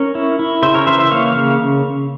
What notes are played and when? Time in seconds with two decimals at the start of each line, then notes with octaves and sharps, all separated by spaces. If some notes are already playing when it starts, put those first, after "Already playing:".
Already playing: C#4 A#4 C#5
0.15 E4
0.39 E4
0.62 C#3 C5 E5
0.74 A#4 C#5
0.87 E3 C5 E5
0.99 C5 E5
1.11 A#3 C#5 F5
1.35 C#3